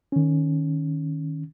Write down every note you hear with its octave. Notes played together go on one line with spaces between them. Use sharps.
D#3 C#4